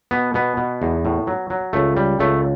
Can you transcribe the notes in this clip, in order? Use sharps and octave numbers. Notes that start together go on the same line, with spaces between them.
B2 B3
B2 B3
B2
E2
A2
F#3
F#3
C#2 A3
G3
C#2 A3